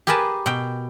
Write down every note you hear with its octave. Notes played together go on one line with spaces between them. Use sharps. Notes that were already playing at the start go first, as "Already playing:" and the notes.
G4 G#4 A#4 B4 G#5 A5
B2 G5